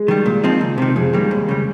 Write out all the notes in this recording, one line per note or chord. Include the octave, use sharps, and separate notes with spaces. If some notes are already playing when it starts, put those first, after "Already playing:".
Already playing: G#3 G#4
D#3 G3
A#2
F3 C4 D#4
C#2
C3 D#3
F2 G#3 G#4
D#3 G3 A#3
D#2
C#3 G3